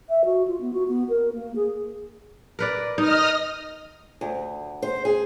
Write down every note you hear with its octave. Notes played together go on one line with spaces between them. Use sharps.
E5
F#4
F4
B3
F#4
B3
A#4
A#3
G#4
A#4 B4 D5
D#4 D#5 D#6 F6
D2
C5
G#4